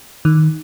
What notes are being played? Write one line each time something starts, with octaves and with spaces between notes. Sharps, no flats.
D#3